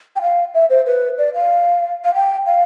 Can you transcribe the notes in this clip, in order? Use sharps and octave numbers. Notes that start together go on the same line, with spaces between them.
G5
F5
E5
C5
B4
D5
F5
F5
G5
F5